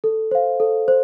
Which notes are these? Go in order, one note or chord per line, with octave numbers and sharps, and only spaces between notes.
A4
C5 F5
A4
C5